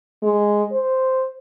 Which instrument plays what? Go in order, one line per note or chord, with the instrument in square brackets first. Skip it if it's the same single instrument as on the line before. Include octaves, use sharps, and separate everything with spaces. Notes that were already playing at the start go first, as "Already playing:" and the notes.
[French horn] G#3
C5